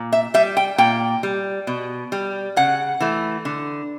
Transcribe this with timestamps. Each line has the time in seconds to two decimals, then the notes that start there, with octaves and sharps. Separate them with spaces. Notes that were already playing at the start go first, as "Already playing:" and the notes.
Already playing: A#2
0.13 E5
0.34 G3 E5
0.57 G5
0.78 A#2 G5
1.23 G3
1.67 B2
2.12 G3
2.56 C#3 F#5
3.00 E3 A3
3.45 D3